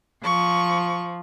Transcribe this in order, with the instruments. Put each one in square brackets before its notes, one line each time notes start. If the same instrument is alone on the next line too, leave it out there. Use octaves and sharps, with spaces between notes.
[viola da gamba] F3 [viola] C#6